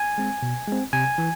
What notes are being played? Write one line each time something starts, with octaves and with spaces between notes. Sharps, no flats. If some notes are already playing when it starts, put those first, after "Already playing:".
Already playing: G#5
G#3 C4
B2
G#3 C4
C3 G#5
E3